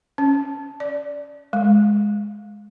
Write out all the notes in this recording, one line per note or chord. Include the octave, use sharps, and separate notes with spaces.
C#4
D5
G#3